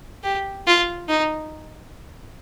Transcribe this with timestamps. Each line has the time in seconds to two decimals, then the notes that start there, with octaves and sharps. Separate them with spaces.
0.24 G4
0.67 F4
1.09 D#4